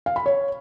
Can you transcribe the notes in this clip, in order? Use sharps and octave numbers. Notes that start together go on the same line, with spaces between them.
F5
B5
C#5